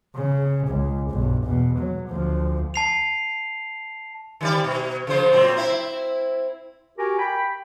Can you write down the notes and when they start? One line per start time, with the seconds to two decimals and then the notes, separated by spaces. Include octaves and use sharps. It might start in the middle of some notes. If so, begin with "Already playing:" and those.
0.15 C#3
0.67 C#2
1.10 B1 G2
1.43 E2 B2
1.77 F#3
2.08 D2 F3
2.74 A5 C7 F7
4.41 D#3 G3 D5
4.64 B2
5.07 C#3 F3 C5
5.32 A#2 F#3 C4
5.56 C4 E4
6.98 F#4 G4 A#4 G#5
7.19 G5 B5